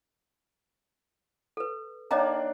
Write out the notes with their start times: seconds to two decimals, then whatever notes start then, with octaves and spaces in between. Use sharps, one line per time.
1.57 A4 B4
2.11 D#3 A#3 D4 C#5 D#5 A#5